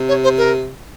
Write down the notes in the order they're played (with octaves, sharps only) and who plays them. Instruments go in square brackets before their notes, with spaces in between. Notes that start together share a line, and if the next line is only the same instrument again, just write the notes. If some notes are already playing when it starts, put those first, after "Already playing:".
Already playing: [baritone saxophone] C3
[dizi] C#5
C5
A#4